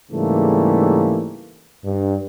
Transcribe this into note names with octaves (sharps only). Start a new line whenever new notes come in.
G#2 C#3 E3 G3 A3 A#3
G2